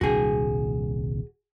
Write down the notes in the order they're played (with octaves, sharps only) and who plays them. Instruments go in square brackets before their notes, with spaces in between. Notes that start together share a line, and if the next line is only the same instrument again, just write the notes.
[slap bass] D#1 C2 D4 [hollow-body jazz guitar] F#4 G#4